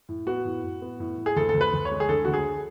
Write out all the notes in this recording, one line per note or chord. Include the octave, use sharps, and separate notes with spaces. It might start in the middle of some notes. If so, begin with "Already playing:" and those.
A2
B3 F#4
A2
A2
B3
A2
A2
G#4
D2 A4
A4
D2
B4
D2
C#5
G#3
G#4
D3 A4
D2 F#4
G#4